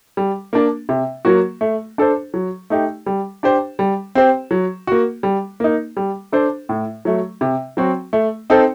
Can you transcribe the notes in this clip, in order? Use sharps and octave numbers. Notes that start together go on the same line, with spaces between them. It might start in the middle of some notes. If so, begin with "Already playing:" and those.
G3
A#3 D4
C3
F#3 A#3 F#4
A3
D4 A4 C5
F#3
A3 D#4 G4
G3
D4 G4 C5
G3
C4 G4 C5
F#3
A#3 F#4
G3
A#3 D#4
G3
D4 A4 C5
A2
F#3 A3
C3
F#3 C4 F#4
A3
C4 D#4 A4 C5